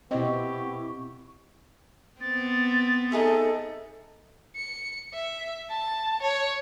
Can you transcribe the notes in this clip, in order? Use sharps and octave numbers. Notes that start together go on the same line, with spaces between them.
B2 B3 C4 E4 G4 D#5 G5 C#6
B3 C4 A6
D#4 G#4 A4 E5
C#7
E5
A5
C#5